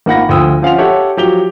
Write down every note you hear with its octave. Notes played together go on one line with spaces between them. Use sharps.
G#1 A#3 F4 F#5 B5 A#6
D2 F3 G5 D#6 E6
F3 C#4 F5 F#5 C6 F7
G4 A4 C#5 E5 F#5
F3 F#3 G4 F7 G7